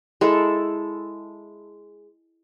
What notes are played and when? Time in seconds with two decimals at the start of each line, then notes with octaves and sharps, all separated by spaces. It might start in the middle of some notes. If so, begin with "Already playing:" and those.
0.21 G#3 E4 A4